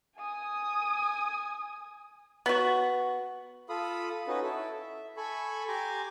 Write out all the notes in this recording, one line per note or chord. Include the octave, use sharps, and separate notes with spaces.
G#5 D#6
B3 F#4
F4 A4 F5 B5 D#6
C#4 D#4 F#4 B4
E4 A4
E5
A4 G#5 B5 C#6
G4 G#5 A#5 C6 D6